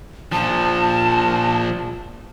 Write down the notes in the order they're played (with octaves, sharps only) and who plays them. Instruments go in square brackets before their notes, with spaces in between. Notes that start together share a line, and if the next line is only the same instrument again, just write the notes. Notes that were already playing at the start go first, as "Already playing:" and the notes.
[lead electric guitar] A#2 F3 [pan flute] A5